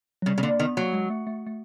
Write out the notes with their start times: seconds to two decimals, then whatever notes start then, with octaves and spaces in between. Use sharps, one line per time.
0.22 F#3
0.26 C#3 G3
0.38 C#3
0.43 D3 A#3
0.60 D#3 B3
0.77 F#3 A#3
0.93 G#3
1.10 A3
1.27 A3
1.47 A3